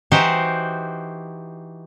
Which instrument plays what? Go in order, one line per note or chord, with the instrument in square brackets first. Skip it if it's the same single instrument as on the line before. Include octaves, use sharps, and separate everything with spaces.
[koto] E3 D#4 F#4 G4 C5